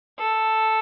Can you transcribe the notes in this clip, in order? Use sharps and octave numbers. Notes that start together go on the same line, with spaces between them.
A4